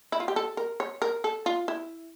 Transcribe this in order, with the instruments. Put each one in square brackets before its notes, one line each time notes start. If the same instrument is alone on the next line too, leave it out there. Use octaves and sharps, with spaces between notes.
[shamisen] E4
F4
G4
A4
A#4
C#5
A#4
A4
F4
E4